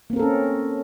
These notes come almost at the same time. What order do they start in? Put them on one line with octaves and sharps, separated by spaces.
A#3 C4 A#4 A4 C#4